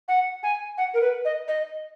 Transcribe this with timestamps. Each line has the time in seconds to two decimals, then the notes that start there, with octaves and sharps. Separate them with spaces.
0.08 F#5
0.43 G#5
0.77 F#5
0.94 A#4
1.01 B4
1.25 D#5
1.48 D#5